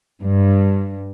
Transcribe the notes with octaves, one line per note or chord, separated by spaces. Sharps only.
G2